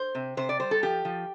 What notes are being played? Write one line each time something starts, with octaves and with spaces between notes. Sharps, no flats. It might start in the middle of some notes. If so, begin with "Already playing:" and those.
Already playing: C5
C3
C3 C5
D5
G3 C5
A4
F3 G4
F3